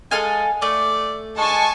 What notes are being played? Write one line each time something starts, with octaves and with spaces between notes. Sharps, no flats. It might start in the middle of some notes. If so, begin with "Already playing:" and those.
G#3 A4 F5 G#5
A3 D5
G#3 G#5 A5 C#6